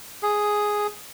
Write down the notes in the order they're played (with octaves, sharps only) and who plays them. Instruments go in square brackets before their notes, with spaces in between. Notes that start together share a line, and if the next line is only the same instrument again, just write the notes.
[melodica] G#4